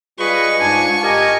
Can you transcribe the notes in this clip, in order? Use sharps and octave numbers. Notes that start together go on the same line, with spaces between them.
G3 F4 G#4 B4 D#5 C#6
G#2 D4 G#5
G4 A#4 D#5 G#5